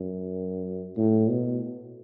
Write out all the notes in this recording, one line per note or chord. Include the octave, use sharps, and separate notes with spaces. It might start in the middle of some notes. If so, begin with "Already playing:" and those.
Already playing: F#2
A2
B2